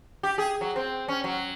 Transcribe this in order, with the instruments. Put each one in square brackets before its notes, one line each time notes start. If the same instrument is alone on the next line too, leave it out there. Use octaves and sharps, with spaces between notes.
[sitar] G4
G#4
F#3
C4
C#4
F#3